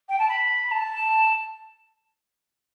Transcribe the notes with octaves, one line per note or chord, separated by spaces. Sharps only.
G5
A5
B5
B5
A5